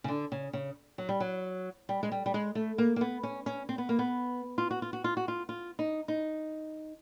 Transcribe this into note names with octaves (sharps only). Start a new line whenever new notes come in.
C#3
D3
C#3
C#3
F#3
G3
F#3
G3
G#3
G3
G3
G#3
A3
A#3
A#3
B3
C#4
C#4
C4
B3
A#3
B3
F4
F#4
F4
F#4
F4
F#4
F4
F4
D#4
D#4